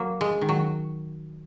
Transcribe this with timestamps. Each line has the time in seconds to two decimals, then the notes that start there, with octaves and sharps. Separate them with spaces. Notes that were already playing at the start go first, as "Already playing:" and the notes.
Already playing: F#3 A#3
0.21 G#3
0.41 D#3
0.49 F#3